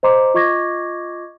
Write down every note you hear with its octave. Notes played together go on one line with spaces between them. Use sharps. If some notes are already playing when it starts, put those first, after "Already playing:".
C5 D#5 A#5 C6 D6
F4 D#5 C#6 D6 G#6 A#6